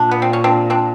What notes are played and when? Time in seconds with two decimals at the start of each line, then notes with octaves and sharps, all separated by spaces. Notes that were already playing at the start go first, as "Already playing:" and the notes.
Already playing: A#2 D4
0.11 B3
0.22 C4
0.33 C#4
0.44 C4 D4
0.70 C4 D4